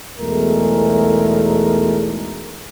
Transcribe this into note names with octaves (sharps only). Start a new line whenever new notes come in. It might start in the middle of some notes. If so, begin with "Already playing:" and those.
B1 E2 G#3 A3 A#4